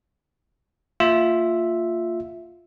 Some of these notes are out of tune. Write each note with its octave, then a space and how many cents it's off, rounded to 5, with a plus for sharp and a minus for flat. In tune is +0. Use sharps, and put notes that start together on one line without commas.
A#3 -30 F4 +0 E5 +0